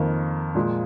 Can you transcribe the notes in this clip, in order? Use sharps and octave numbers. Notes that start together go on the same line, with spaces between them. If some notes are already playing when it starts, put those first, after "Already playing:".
Already playing: F2 D#3 A#3
A#2 F3 G#3